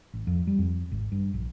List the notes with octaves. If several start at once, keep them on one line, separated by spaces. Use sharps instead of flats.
A1
F2
G3
F2
G#1
G2
A#1